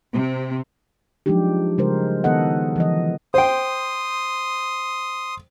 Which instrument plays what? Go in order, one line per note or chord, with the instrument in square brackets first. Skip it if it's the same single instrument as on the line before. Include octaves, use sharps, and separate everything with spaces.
[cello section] C3
[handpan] F3 F#3 G#3 D4 D#4 G4
C#3 G3 G#3 A#4 C5
D#3 B3 A4 D#5 F#5
E3 F3 D#5
[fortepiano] C5 G5 [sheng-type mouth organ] C6 D#6